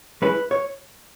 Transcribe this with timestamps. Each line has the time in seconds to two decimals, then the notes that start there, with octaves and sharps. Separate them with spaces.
0.22 G#3 C#4 E4 B4
0.51 C#5